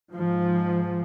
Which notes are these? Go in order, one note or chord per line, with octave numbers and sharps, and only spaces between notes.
G#2 F3